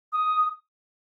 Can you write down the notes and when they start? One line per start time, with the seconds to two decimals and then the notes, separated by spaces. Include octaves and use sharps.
0.12 D#6